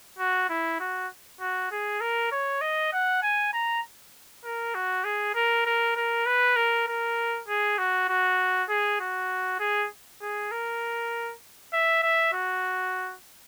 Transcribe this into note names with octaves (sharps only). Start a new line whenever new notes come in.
F#4
E4
F#4
F#4
G#4
A#4
C#5
D#5
F#5
G#5
A#5
A#4
F#4
G#4
A#4
A#4
A#4
B4
A#4
A#4
G#4
F#4
F#4
G#4
F#4
G#4
G#4
A#4
E5
E5
F#4